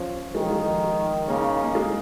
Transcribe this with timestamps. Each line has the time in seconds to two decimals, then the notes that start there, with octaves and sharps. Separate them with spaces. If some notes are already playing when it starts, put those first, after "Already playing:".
Already playing: F3 C#4
0.35 D#3 G#3
0.43 F3
0.51 G#3
1.28 C#3 A#3
1.40 D#4
1.52 D#4
1.63 A#3
1.75 G#3